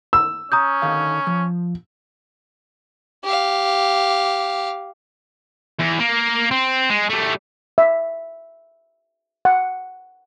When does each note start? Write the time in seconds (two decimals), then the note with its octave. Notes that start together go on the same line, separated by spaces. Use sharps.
0.13 E6
0.52 C#4 A#5 D#6 G6
0.82 D3 D#3 F5
1.27 F3
3.24 G4 F5
5.80 E2
6.00 A#3
6.51 C4
6.90 G#3
7.10 G3 A3
7.78 E5
9.45 F#5